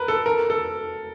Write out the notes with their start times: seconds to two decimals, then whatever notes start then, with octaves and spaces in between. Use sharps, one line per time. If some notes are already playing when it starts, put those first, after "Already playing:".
Already playing: A#4 B4
0.08 A4
0.26 A#4
0.50 A4